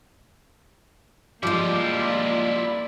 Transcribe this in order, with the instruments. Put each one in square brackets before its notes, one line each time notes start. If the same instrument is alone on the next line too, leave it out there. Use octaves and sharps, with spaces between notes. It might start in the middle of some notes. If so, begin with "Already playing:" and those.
[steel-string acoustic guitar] F3 G#3 [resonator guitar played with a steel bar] G3 [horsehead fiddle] A#3 D5 [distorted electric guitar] E4 F4